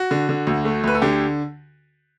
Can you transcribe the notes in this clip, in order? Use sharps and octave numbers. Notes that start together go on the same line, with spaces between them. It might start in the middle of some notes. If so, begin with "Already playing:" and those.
Already playing: F#4
D3
D3
D2
A3
D2 B4
A4
D3 G4